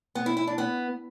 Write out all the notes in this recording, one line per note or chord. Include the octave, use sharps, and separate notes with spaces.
B3
E4
E4
D4
B3